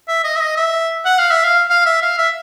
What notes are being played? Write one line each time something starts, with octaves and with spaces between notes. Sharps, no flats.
E5
D#5
E5
D#5
E5
F#5
F5
E5
F5
F5
E5
F5
E5